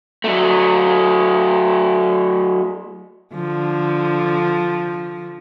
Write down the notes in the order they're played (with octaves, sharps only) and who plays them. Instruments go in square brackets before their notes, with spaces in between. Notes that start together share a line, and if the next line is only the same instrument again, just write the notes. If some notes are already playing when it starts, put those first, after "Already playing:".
[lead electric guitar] F#3 A3
[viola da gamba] D3 F3